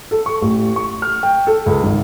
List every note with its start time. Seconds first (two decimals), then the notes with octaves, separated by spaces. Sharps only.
0.11 A4
0.26 C#6
0.42 A1
0.76 C#6
1.02 F6
1.23 G5
1.47 A4
1.66 C#2
1.84 G#1